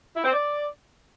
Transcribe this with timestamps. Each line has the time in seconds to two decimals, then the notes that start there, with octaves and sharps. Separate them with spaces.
0.16 E4
0.24 C4
0.33 D5